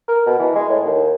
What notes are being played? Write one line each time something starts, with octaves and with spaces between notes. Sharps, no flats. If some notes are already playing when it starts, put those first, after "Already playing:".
A#4
B2
E3
G#3
A2
D#2